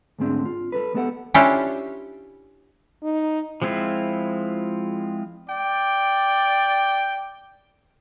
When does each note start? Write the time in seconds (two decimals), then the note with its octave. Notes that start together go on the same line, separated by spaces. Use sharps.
0.19 D2 G#2 G#3 C4 D4
0.45 F4
0.72 G3 A4 B4
0.94 G#3 B3 G4 A4 D#5 F#5
1.34 C#4 D4 E4 F4 G4 A4
3.03 D#4
3.62 F3 G#3 C4 E4 F4
5.50 D5 G5